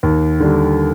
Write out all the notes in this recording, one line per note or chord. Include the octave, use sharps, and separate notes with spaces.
D#2
D3 G3